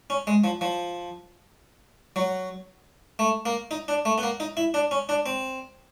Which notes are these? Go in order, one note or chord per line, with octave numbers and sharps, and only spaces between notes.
C#4
G#3
F3
F3
F#3
A3
A#3
D#4
D4
A3
B3
A#3
D#4
E4
D4
C#4
D4
C4